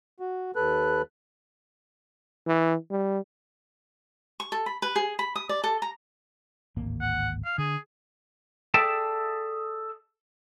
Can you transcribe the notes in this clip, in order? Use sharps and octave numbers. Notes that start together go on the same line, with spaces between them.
F#4
D#2 A4 B4 F#6
E3
G3
C#6
A4
B5
B4
G#4
B5
D#6
D5
A4
A#5
D1 G#1 A#3
F#5
F5
D3 G#4
G#4 A4 D5 E5 G5 A5